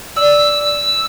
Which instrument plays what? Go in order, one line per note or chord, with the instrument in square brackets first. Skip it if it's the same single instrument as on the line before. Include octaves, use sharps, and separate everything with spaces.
[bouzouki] D5 [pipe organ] E6